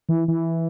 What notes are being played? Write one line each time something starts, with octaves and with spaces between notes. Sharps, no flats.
E3
E3